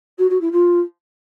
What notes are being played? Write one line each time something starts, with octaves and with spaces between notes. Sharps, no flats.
F#4
F#4
E4
F4